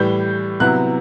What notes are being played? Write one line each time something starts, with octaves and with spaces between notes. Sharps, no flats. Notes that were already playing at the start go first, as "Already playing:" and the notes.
Already playing: A2 E3 G3 G6
C3 F#3 B3 E4 F#6